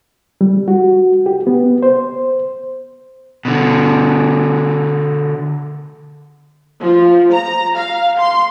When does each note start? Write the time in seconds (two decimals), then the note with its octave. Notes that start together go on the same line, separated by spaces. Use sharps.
0.41 G3
0.68 F#4
1.26 G4
1.47 B3
1.83 C5
3.45 B2 D3
6.82 F3
7.33 A#5
7.77 F5
8.19 C6